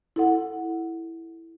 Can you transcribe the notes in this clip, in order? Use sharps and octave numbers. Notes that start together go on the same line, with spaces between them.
E4 A4 F#5